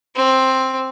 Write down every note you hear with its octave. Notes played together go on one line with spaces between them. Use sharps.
C4